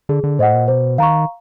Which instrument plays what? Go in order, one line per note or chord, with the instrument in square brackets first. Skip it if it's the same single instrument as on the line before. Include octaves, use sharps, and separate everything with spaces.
[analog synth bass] D3 [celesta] G#4
[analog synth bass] D3
[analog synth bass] A2 [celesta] C5 D#5 F#5
[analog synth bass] A#2
[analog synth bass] B2 [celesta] C5
[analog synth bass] D#3 [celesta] F5 A#5 C#6